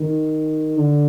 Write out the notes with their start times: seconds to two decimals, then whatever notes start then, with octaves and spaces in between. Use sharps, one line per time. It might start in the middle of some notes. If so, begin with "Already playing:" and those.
Already playing: D#3
0.77 D3